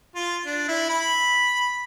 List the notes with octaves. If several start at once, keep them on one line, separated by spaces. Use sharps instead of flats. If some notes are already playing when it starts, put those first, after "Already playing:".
F4
D4
E4
B5